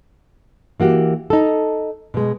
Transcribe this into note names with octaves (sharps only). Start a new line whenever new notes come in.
E3 A#3 F#4 G4
D#4 A4
B2 G#3